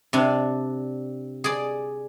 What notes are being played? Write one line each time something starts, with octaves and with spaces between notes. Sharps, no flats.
C3 D4
G#4 D5